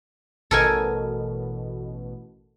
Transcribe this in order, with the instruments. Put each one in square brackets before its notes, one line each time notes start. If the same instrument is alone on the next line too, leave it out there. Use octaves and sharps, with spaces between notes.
[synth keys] A1 B2 [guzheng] A4 A#4 G#5